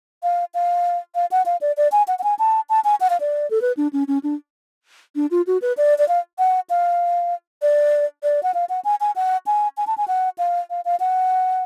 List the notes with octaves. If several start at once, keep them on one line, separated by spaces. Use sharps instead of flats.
F5
F5
F5
F#5
F5
D5
D5
G#5
F#5
F#5
G#5
A5
A5
G#5
F#5
F5
D5
A4
B4
D4
C#4
C#4
D4
D4
F4
F#4
B4
D5
D5
F5
F#5
F5
D5
D5
F#5
F5
F#5
G#5
G#5
F#5
G#5
G#5
A5
G#5
F#5
F5
F5
F5
F#5